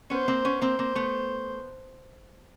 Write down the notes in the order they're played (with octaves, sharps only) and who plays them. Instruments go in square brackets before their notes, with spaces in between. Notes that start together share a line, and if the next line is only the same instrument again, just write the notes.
[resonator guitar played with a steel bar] B3 C#4 [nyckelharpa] C5
[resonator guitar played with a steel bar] A#3 C4
B3 C#4
[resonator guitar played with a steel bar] A#3 C4 [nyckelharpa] C5
[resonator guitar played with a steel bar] A#3 C4
A3 B3